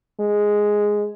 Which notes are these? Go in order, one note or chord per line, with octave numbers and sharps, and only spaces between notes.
G#3